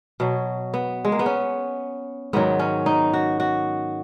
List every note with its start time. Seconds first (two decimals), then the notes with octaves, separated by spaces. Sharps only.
0.20 B2 F#3
0.74 B3
1.05 G#3
1.12 A#3
1.19 B3
1.26 C#4
2.33 G#2 D#3 F#3 B3
2.59 C#4
2.86 D#4
3.13 F#4
3.40 F#4